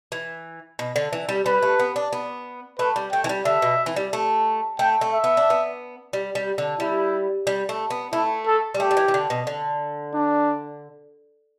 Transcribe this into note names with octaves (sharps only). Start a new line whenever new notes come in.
E3
B2
D3
E3
G3
G3 B4
A3
B3
D4
B3
A3 B4
G3
A3 G5
E3
G3
D3 E5
B2
E3
G3
A3
A3 G5
A3
E5
B3
D4
B3
G3
G3
D3
G3 E4
G3
A3
B3
A3 E4
A4
G3
A3 G4
G3
E3
E3
D3
B2
D3
D4